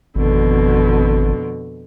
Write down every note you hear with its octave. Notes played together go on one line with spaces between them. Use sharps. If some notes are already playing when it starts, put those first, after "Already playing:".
G#1 F2 B2 D3